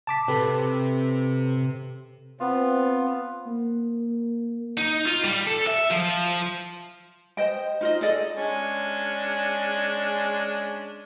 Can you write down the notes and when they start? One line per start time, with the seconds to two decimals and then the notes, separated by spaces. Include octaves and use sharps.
0.07 A5 D6 B6
0.28 C3 G4 A4 B4
2.40 B3 C4 F4
3.47 A#3
4.78 D#4
5.05 F4
5.24 G3
5.47 A4
5.67 E5
5.90 F3
7.37 C5 D#5 G5
7.81 D#4 F4 C5 D#5
8.01 G#4 A4 D5 D#5
8.36 G#3 C#4 D4